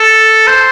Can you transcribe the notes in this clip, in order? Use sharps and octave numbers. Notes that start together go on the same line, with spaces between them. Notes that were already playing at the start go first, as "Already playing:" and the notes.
Already playing: A4
C5